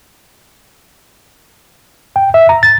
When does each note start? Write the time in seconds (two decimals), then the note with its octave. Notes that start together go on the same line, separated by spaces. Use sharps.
2.16 G5
2.34 E5
2.49 A#5
2.63 A6